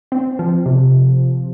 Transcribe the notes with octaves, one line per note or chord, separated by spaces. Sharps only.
C4
F3
C3